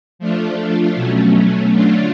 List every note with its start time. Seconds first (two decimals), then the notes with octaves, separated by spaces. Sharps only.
0.19 F3 A3 D4 F4
0.95 B2 F#3 A3 C#4
1.72 D3 F#3 A3 D4 F4